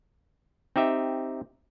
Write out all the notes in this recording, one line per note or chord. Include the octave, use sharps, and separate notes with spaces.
C4 D#4 G4 E5